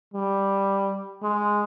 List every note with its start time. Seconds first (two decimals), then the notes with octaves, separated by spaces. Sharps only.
0.14 G3
1.23 G#3